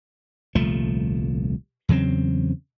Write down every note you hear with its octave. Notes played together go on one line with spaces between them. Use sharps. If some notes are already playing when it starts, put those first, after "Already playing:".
D#1 C2 F3 A3
E2 C#3 F#3 C4